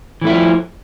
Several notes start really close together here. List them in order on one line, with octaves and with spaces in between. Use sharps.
E3 A3 E4 F3